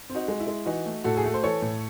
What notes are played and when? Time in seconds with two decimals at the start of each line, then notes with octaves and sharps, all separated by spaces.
0.09 C4
0.15 D#4 F#4
0.28 G#3
0.40 E4
0.47 G#3
0.66 E3 D#4 F#4
0.86 A3
1.04 A2 F#4 A4
1.17 G#4
1.23 A3 A4
1.34 C5
1.43 E3 A4 C#5
1.62 A2